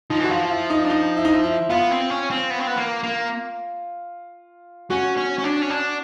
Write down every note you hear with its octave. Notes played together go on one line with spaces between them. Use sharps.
F3 D#4
E3
F#4
F3 F4
F4
E4
D#4
D4
D#4
E4
D#4
E4
E4
B3 F4
C4
C#4
C4
B3
C4
B3
A#3
A#3
C#4 F#4
C#4
C#4
D4
C#4
D4